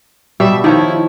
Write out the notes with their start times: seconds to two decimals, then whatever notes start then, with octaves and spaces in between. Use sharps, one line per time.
0.40 B2 G3 E5
0.64 D#3 F3 E4 C#5